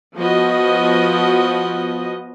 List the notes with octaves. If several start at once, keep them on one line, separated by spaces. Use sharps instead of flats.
F3 B3 F#4 D#5